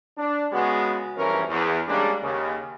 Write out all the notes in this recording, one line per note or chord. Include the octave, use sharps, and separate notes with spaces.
D4
C#3 G#3 B3 F#4
G#1 G2 E3 F3 C#4 A#4
E2
G3 G#3 A#3 C#4 D4
D#2 C#3